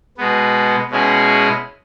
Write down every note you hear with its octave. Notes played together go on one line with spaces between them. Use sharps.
B2 G#3 B3
B2 G#3 C#4 E4 G#4